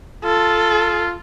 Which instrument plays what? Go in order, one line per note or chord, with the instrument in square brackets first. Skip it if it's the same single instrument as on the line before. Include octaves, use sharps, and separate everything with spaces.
[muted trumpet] F4 [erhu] A4